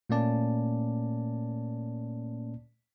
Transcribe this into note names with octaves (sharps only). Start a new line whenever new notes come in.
A#2 A3 A#3 C#4 D5 A5